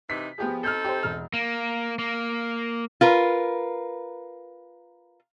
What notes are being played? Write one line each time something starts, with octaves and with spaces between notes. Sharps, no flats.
C3 E3 D#4 B6
F3 B3 G4 G#4
C4 D#4 A4 F6 G6
G4 C5
E1 F6
A#3
A#3
F4 A#4 B4